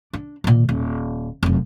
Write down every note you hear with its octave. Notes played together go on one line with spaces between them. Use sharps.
D4
A#2 D#3
D#1
F1 F#2